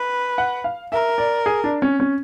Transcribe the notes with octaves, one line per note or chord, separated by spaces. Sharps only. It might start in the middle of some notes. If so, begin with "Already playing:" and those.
Already playing: B4
F#5
F5
A#4 E5
D5
G#4
D4
C#4
C#4